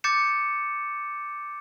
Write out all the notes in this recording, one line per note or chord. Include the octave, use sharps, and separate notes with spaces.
D6 G6 A6 C#7 E7